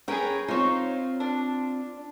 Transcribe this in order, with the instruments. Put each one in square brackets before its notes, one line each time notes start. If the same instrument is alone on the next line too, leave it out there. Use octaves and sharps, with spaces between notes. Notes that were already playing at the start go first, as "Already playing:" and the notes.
[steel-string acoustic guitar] C#4 A#4 [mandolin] G#4 B4 G5
[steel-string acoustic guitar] C4 F4 [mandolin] D#4 C#5
[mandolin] D4